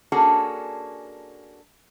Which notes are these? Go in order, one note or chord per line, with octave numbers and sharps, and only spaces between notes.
A#3 C#4 D4 F#4 G#4 A4